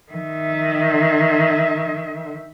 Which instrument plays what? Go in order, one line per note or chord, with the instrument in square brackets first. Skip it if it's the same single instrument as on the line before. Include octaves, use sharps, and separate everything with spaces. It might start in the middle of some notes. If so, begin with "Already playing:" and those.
[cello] D#3 E5